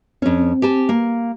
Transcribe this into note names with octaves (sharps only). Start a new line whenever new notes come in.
F2 C4 C#4
G4 G#5 A5
A#3